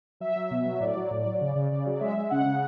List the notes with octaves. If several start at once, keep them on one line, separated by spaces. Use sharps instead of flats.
F#3 E5
F#3
B2
F#3
A2 D5
F#3
A2
F#3
C#3
C#3
C#3
F#3
G#3 E5
G#3
C#3 F#5
C#3